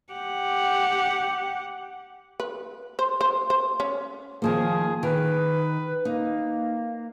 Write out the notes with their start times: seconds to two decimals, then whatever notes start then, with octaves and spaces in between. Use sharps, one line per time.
0.13 G4 F#5
2.40 B4
2.99 C5
3.21 C5
3.50 C5
3.80 C#4
4.42 D#3 F3 A#3 G#4
5.03 D#3 B4
6.05 A#3 D#4